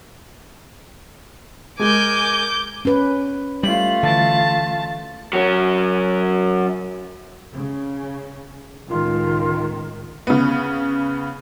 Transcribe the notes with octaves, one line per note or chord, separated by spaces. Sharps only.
G#3 A#4 G#5 D6 G6
C#4 B4
G3 A3 F4 F#7
D3 E3 A5
F#3 C#4
C#3
C#2 A2 D#3 F4
C#3 B3